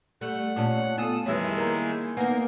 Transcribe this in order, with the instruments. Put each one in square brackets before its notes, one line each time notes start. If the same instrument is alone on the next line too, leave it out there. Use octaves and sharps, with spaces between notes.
[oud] G3 A3 [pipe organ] F#5
[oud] A#2 C#4 [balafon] F4 D5 A5
[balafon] A3 B3 [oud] F4 A4 [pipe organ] D#6 E6
[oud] F2 E3 [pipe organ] D#3 G#3 E4 [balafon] G3 G4 C#5
[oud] A#3 [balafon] A#4 A#5
[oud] A#3 D#4 [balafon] B3 B4 F#5 [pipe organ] A#4